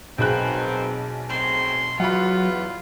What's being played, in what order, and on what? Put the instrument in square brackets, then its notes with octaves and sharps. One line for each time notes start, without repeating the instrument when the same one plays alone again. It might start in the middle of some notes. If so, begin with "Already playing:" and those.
[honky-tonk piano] B1 G#4 F#6 [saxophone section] F#2 B3 C4
[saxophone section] F#2 A2 C4 [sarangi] C6
[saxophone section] E2 [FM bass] F#3 [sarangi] F4 [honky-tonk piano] F#5 B5